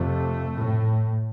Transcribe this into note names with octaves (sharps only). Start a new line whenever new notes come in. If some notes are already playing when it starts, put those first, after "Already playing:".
Already playing: F2 C3 A3
A2